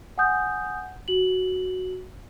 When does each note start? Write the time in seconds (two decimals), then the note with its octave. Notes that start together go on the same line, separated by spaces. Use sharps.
0.18 F#5 G#5 D#6 G6
1.08 F#4 F#7